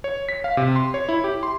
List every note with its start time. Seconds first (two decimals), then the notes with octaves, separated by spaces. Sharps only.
0.04 C#5
0.29 B6
0.44 F5
0.57 C3
0.76 C6
0.94 C#5
1.09 E4
1.24 G4
1.43 C6